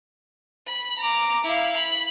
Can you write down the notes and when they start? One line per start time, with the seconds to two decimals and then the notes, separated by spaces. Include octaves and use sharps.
0.67 B5
0.99 A#5 D6
1.45 E4 F5
1.77 B5